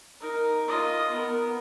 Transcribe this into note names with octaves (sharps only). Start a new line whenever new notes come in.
D#4 A#4
F4 D#5
B3 A#4